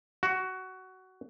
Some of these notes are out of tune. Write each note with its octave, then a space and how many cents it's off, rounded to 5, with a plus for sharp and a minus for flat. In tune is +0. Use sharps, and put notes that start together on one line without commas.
F#4 +15